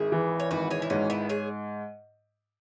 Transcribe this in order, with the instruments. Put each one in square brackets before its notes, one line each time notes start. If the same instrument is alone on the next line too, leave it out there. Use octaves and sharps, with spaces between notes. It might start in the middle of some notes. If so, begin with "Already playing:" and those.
Already playing: [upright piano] G#1 [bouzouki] E4 G#4
[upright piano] E3
[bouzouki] C#5
[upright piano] G#1 [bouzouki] F#4 B4
[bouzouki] G#4 C#5
E4
[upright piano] G#2 [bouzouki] C#4 F#4
[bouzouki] B3 E4
G#4 C#5